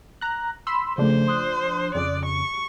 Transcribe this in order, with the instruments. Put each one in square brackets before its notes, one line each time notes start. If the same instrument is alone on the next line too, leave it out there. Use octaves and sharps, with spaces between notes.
[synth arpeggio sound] A#5 F#6
B5 C6 E6
[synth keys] C#3 A3 [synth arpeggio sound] F3 D4 [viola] C5
[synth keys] C6 D#6 F#6
[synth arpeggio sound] F2 C#3 [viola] D5
[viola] C#6